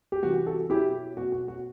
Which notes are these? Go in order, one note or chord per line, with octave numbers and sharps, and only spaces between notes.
G4
C3 E3 G3 F#4
F#4 A4
B2 F#3 E4 G4
B2 F#3 F#4
F#4
F#4